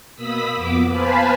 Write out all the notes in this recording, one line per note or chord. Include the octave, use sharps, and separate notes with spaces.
B2 A#3 B5 D#6 E6 B6
F2 B3 D6
B4 C5 F5 G#5 A5 B5